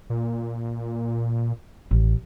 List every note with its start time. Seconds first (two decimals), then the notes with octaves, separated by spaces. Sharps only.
0.10 A#2
1.91 A1